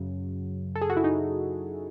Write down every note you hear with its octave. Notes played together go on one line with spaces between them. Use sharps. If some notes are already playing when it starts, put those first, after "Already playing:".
Already playing: F#2 C#3 F#3
A4
G#4
F#4
E4
D#4